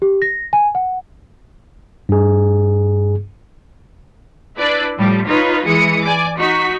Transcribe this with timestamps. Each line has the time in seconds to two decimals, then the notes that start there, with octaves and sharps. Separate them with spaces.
0.02 G4
0.22 A#6
0.53 G#5
0.75 F#5
2.09 G2 G#4
4.58 D4 E4 B4 D5
4.98 A2 F3 G3
5.26 D#4 F4 B4 C#5
5.66 E3 G#3 D#6 C#7
6.03 D5 G#5 D6
6.37 D#4 F#4 C#6 B6